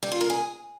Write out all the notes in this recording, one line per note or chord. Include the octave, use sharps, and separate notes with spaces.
G3
F4
A#4
G#4